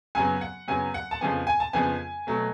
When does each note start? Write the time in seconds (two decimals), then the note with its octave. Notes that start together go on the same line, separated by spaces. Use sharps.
0.15 F#2 C#3 F#3 B3 G#5
0.41 F#5
0.68 F#2 C#3 F#3 B3 G#5
0.94 F#5
1.11 A5
1.21 F2 C#3 F3 B3 G#5
1.47 G#5
1.60 A5
1.73 F2 C#3 F3 B3 G#5
2.27 B2 F#3 A3